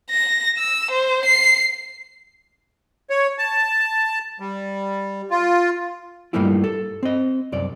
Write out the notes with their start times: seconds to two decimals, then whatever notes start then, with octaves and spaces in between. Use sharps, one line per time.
0.10 A#6
0.58 E6
0.91 C5
1.26 C7
3.10 C#5
3.38 A5
4.40 G3
5.31 F4
6.33 G2 G3 A3 A#3 E4 F4
6.64 A4
7.03 C4 D#5
7.52 C2 F#2 D5